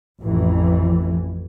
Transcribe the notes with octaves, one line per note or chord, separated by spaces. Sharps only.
A1 F2 E3